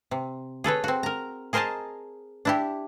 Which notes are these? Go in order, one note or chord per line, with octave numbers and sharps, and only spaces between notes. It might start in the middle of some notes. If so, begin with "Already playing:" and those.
C3
G#4 A4 B4 C#5
C4 F#4
A#4 A#5
G#4 A#4 C5 D#5 G#5 A5
D4 E4 G4